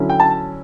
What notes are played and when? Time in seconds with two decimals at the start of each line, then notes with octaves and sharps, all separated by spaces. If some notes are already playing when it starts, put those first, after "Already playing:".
Already playing: D3 F#3 C#4 E4
0.10 G5
0.20 A5